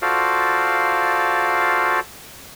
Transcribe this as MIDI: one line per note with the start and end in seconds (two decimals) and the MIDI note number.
0.02 2.00 65
0.02 2.00 66
0.02 2.00 69
0.02 2.00 72
0.02 2.00 74
0.02 2.00 77